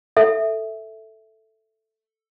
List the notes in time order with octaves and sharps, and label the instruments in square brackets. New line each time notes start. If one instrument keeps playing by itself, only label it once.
[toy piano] A4 E5